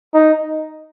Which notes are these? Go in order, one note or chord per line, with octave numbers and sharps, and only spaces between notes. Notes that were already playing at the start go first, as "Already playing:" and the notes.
D#4